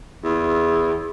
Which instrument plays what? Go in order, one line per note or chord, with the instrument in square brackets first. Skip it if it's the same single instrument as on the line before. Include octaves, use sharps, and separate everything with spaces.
[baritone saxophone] E2